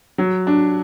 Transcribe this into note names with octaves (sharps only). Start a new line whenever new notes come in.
F#3
D4